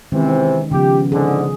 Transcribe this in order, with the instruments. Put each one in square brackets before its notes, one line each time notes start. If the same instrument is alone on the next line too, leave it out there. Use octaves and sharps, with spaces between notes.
[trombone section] C3 E3 C4 [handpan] D#3 G#3 C#4
[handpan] C#3 F3 B3 [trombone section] G4
[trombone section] G#2 D3 [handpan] G#4